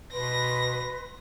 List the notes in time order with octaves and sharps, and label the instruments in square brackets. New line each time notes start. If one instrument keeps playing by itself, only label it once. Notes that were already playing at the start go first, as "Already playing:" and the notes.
[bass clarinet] B2 [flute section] B4 C6 [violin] A#6